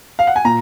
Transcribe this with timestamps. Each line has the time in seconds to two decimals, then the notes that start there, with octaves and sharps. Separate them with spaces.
0.19 F5
0.27 F#5
0.36 G#5
0.45 A#2 A#5